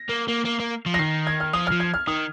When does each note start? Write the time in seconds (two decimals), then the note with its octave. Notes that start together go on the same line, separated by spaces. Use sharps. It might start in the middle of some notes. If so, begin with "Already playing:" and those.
Already playing: A#6
0.09 A#3
0.28 A#3
0.45 A#3
0.60 A#3
0.86 F3
0.94 A#6
0.99 D#3 C7
1.27 G#6
1.40 F6
1.53 F3 D#6
1.67 F6
1.71 F3
1.80 G#6
1.94 F6
2.07 D#3 D#6